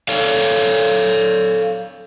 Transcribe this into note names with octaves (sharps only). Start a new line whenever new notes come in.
A4 C#5 F5